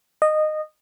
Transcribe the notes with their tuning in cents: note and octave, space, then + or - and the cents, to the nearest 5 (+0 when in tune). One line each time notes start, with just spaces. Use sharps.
D#5 -15